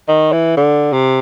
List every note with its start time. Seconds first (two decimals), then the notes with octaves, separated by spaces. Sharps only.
0.08 D#3
0.32 E3
0.57 D3
0.93 C3